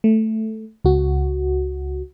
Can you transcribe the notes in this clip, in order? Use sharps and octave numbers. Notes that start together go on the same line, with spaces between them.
A3
C#2 F#4